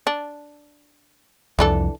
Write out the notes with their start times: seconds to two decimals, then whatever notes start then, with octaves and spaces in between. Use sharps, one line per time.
0.07 D4
1.59 C2 F2 E3 D4 A4